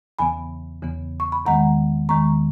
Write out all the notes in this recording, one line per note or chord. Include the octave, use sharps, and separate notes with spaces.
E2 C#3 E3 B3 G#5 B5
E2 C#3 E3 B3
C#6
B5
E2 D#3 G#3 B3 F#5 A#5
E2 D#3 G#3 B3 A#5 C#6